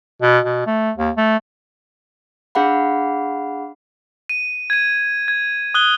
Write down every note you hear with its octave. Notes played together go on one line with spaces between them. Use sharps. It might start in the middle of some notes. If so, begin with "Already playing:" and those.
B2
B2
A3
D#2
A3
D4 G#4 F5 F#5 B5
D#7
G#6 D#7
G#6
D#6 F#6 G7